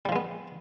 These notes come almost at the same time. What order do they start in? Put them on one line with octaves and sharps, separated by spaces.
G3 F3 G#3 B3